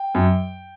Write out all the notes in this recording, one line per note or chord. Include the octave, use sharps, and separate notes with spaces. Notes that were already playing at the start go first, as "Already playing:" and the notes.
Already playing: G5
F#2